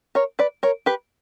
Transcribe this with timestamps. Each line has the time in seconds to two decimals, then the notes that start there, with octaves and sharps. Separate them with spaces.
0.15 A#4 C#5
0.39 B4 D5
0.63 A#4 C#5
0.86 G4 B4